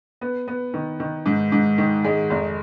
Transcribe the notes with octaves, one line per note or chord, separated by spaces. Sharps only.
B3
B3
D#3
D#3
G#2
G#2
D#3
G#3
F1